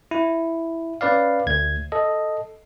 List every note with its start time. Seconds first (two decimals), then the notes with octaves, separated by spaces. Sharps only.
0.11 E4
1.01 C#4 B4 D5 F5
1.47 D2 G#6
1.92 A4 D#5